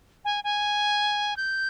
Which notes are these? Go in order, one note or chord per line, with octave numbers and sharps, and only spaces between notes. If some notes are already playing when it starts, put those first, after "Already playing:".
G#5
G#5
G6